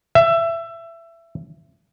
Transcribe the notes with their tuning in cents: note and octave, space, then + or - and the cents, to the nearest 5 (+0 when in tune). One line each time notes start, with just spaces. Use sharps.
E5 +20